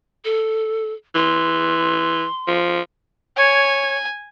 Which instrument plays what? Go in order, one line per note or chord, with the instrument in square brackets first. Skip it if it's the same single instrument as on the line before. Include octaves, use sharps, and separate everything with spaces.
[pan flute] A4
[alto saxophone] E3 [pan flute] C6
[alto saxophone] F3
[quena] C#5 [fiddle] G#5